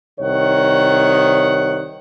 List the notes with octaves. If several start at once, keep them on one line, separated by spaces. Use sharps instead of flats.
C2 D#3 C#5 F#5